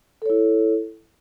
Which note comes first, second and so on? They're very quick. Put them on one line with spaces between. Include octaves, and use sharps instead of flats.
A4 C#5 E4